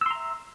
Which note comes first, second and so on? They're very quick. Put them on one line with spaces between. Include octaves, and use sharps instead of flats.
E6 C6 A#5 E5